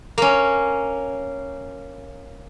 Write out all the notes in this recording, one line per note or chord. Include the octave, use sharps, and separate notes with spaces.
A#3 C#4